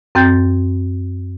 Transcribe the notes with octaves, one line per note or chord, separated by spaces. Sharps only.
F#2 C4 G5 G6 A6